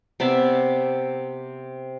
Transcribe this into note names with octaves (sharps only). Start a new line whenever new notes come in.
C3 B3 D5 E5